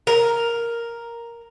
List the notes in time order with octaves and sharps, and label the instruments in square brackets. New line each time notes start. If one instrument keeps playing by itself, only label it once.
[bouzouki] A#4